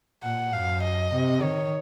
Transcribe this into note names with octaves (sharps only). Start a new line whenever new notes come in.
A#2 F#5
F#2 F5
D#5
C3
D#3 C#5